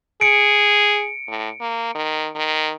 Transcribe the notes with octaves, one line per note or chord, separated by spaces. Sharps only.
G#4 C#7 D7
A2
A#3
D#3
D#3